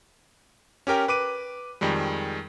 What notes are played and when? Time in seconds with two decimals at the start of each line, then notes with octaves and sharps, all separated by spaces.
0.87 C#4 G4 A#4 G5
1.08 B4 D6 D#7
1.81 F2 D#3 G3 G#3